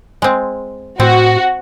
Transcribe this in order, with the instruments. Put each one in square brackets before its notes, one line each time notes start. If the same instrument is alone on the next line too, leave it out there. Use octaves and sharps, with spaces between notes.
[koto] G#3 C4
[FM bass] A2 [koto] C4 [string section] F#4